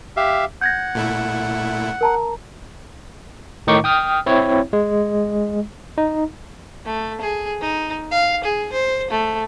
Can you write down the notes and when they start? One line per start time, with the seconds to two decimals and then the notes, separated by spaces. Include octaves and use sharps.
0.17 G4 E5 F5
0.61 F#5 G6 G#6 A#6
0.95 A#2 A3 E4
2.01 A#4 A5 A#5
3.67 A2 D#3 D#4 C#6 D6
3.84 G5 D#6 F6
4.26 C4 E4 C#5
4.73 G#3
5.98 D#4
6.86 A3
7.21 G#4
7.61 D#4
8.11 F5
8.44 G#4
8.72 C5
9.11 A3